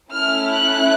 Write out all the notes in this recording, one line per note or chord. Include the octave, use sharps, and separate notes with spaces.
A3 C#4 E4 F6
F#6